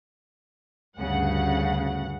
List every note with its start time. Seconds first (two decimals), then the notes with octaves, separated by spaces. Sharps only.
0.98 D2 G2 C#3 F#5